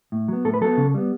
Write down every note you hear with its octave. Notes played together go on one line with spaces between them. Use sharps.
A2
F#3 B3
A2 A4
B4
F#3 B3 A4
C#3
G3 B3